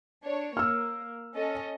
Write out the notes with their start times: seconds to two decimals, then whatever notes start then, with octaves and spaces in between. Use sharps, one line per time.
0.23 D4 C#5
0.57 A#3 E6 F6
1.34 C#4 A4 D#5